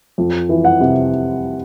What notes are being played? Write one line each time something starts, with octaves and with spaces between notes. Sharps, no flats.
F2
E3
F#5
C3